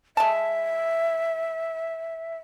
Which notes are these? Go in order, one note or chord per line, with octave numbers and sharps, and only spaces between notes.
G#3 E5 A5